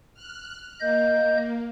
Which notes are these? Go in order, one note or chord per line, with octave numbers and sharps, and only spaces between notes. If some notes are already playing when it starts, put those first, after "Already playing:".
F6 F#6
A#3 D#5 G6